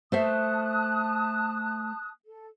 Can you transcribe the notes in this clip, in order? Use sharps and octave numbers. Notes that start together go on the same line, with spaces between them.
A3 C5 E5 A5 D#6 F#6
A4